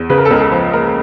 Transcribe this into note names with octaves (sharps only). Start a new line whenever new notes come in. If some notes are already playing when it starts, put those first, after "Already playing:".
Already playing: E2
C#3 B4
A#4
A4
C#2 A#4
A4
F3
A#3 A#4